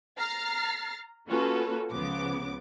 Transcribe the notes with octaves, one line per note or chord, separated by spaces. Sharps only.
A#5 F6 A6 C7
A#3 C#4 F4 F#4 A4 B4
C#2 C#3 F3 B3 D6